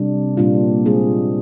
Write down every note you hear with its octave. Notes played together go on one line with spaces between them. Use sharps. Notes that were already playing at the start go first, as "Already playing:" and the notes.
Already playing: C3 G3 D4
A#2 G3 A#3 D4 F4
G#3 C4 F4 G#4